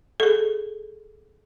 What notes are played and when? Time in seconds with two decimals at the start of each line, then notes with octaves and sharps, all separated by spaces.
0.20 G#4 A4